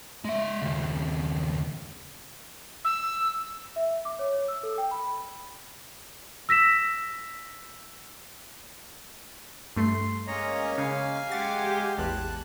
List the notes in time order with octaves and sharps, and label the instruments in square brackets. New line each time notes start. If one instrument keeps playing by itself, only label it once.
[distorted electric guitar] G#3 E5
D#2 C#3
[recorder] E6
[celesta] E5
D6
C#5
C#5
E6
A4
G5
B5
E6 A#6 B6 E7
[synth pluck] G2 A3 [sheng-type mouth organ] C6
[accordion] G#3 A#3 C#4 [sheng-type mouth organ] C#5 D#5 A#5
[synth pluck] C#3 [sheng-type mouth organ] F5 G#5
[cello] G#3 G4 [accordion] F#5 D6 [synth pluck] A6
[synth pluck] A1 E2 [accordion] G3 [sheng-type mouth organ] A5 F#6